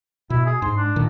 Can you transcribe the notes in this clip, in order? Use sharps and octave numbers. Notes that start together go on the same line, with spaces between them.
B2 E4
G#4
G#2 C6
D4
A#2 D#3